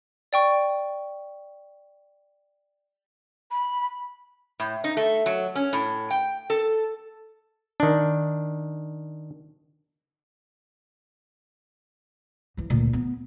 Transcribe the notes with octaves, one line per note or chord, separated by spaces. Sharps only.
D5 G5 C#6
B5
A2
D#4
A3
F#3
C#4
A2
G5
A4
D#3 D4
E3 F3
D2 A#2
B3